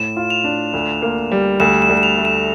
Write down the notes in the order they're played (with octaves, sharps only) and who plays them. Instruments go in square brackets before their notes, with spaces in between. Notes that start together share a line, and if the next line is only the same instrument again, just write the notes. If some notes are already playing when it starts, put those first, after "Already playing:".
Already playing: [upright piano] A2 [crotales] E7
[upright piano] F4
[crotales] F7
[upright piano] D4
D2
A#3
G3
[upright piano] D2 [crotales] E7
[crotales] E7
[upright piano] D2
[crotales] E7
F7
[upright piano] A3
[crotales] E7